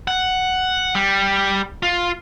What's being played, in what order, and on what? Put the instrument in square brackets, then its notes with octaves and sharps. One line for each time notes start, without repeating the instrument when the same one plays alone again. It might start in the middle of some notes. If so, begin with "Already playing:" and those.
[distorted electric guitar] F#5
G3
F4